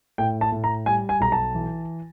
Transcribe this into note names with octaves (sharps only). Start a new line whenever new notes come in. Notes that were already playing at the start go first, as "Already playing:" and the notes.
A2 G5
A5
A2
A#5
G3 G#5
G#5
B1 A#5
A5
E3